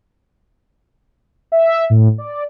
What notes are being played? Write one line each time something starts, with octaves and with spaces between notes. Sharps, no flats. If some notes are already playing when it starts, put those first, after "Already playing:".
E5
A2
D5